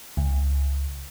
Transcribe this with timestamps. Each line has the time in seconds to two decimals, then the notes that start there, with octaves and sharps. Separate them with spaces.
0.17 C#2